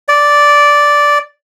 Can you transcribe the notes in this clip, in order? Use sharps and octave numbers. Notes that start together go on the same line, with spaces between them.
D5